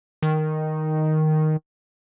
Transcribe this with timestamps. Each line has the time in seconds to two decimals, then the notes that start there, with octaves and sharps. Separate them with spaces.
0.23 D#3